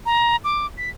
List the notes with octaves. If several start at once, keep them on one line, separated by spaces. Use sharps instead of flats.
A#5
D6
B6